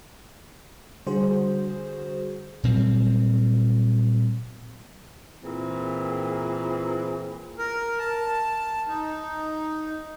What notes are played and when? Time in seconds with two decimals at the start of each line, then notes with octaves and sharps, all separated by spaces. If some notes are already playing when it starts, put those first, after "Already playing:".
1.07 D3 G3 F#4 G#4 C5
2.63 A#2 F#3 G3 C4
5.43 A#2 E3 C4 G#4
7.59 A#4
7.99 A5
8.88 D#4